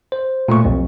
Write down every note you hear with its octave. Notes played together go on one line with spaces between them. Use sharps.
C5
A#2 A3 C#6
B1 F2